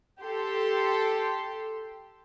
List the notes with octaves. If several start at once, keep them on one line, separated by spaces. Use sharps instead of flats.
G4 A4 C6